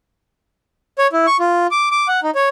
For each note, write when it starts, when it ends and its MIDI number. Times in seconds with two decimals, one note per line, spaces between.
0.98 1.07 73
1.13 1.26 64
1.27 1.37 85
1.40 1.67 65
1.71 1.89 86
1.91 2.08 86
2.08 2.20 78
2.23 2.30 63
2.35 2.49 73